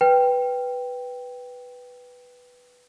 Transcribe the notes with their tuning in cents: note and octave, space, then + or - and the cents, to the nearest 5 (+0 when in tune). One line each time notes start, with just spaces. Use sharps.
B4 +0 G5 +0